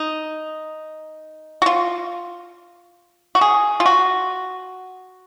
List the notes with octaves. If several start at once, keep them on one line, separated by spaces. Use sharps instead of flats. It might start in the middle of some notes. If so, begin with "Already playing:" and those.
Already playing: D#4
F#4
F4
F#4
G#4
F4
F#4